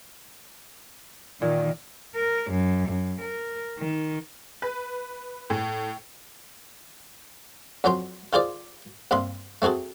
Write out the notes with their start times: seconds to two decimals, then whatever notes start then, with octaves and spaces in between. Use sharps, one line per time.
1.42 A#2 D#3
2.16 A#4
2.50 F#2
2.88 F#2
3.21 A#4
3.79 D#3
4.62 B4
5.50 A2
7.84 F2 F#3 C#4 G5 C6
8.33 D#3 F4 G#4 C5 D5
9.11 G2 C3 A#3 B5 C6
9.62 A3 C4 F#4 G#4 A4